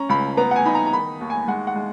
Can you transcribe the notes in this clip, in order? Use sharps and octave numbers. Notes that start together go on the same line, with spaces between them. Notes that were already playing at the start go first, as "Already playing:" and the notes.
Already playing: C#4 A#5
C#2 B5
B3 A#5
F#5
G#5
D#4 B5
A#5
A#5
D#3 B5
D#2
G#5
G#3 F#5
F#5
G#3